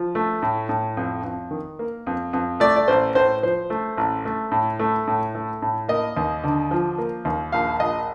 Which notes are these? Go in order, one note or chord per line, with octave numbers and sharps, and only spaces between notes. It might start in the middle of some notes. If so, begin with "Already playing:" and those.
Already playing: F3
A3
A2
A2
F2
F2
D#3
A#3
F2
F2
A3 D5
D5
A1 C5
A2 C5
F3 C5
A3
A1
A3
A2
A3
A2
A3
A2
A#3 D#5
D#2
D3
F3
A#3
D#2
A#1 F5
A#1 D#5